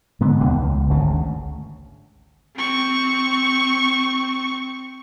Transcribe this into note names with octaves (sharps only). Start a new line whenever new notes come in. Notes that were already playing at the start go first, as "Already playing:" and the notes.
G#2 D3 B3
D#2 B2 D#3
C#2
G#1 D2 C#3
C4 C#6